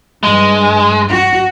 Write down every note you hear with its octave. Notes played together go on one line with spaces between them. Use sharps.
G2 G#3
F#4